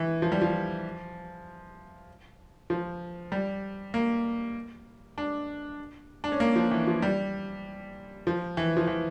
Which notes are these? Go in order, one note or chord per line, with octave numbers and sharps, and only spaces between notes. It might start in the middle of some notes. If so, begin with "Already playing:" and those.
Already playing: E3
F3
G3
F3
F3
G3
A#3
D4
D4
C#4
A#3
F3
E3
F3
G3
F3
E3
F3
E3